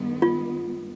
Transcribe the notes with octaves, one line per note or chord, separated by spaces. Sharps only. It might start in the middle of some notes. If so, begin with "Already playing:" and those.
Already playing: G2 D#3 G#3 B3
F4